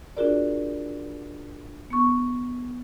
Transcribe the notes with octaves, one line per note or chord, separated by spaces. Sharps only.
D4 F4 F#4 G#4 A#4 D5
B3 C#6